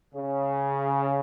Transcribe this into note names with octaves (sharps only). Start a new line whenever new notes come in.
C#3